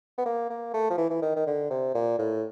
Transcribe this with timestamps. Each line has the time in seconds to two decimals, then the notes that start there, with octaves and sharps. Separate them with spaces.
0.18 B3
0.26 A#3
0.50 A#3
0.74 A3
0.91 F3
0.98 E3
1.10 E3
1.22 D#3
1.37 D#3
1.47 D3
1.71 C3
1.95 A#2
2.19 A2